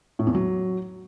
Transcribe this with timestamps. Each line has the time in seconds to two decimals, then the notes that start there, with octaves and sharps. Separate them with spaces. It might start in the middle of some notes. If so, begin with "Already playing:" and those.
0.19 A2
0.27 E2
0.35 F#3